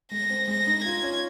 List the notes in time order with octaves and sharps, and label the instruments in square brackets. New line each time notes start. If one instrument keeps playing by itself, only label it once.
[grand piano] G#3 [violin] A#6
[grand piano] C4
[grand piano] G#3 [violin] A#6
[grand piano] D#4
[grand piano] F4 [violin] G#6
[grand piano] C#4